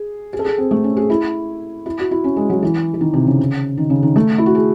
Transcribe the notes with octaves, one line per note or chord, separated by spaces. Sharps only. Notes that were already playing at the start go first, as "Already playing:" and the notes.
Already playing: G#4
G#4
A4
G#4
C4
A3
C#4
G#4
E4
E4
F#4
E4
C#4
G#3
F#3
E3
E3
D#3
C3
C#3
D#3
C#3
D#3
A3
E4
F#4
G#4